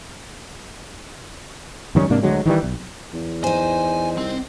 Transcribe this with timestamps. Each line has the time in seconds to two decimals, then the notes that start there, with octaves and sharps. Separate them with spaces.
1.95 F#2 D#3 G3 C#4
2.10 G#2 C3 A#3 D4
2.23 D2 D3 F#3 G#3
2.46 D#3 E3 G3
2.63 B1
3.13 E2
3.44 D#4 C5 G#5
4.18 C2 C4